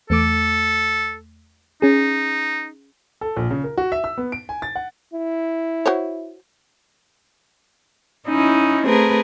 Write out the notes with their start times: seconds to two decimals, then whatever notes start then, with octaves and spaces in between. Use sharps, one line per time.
0.10 E2 A3 A4 D6
1.82 C#4 D#4 G#4
3.21 A4
3.36 A#1
3.50 C#3
3.64 A#4
3.78 F#4
3.92 E5
4.04 E6
4.18 B3
4.32 D7
4.49 G#5
4.62 A6
4.76 F#5
5.14 E4
5.86 F#4 C5 C#5
8.27 C#4 D#4 E4
8.86 A3 C4 G#4 A#4 B4